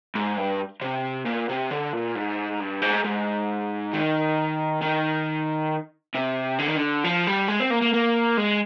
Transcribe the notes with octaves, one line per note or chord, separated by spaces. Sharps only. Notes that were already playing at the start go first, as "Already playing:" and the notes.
G#2
G2
C3
A#2
C3
D3
A#2
G#2
G2
G#2
G#2
D#3
D#3
C3
D3
D#3
D3
F3
G3
G#3
C4
A#3
A#3
A#3
G#3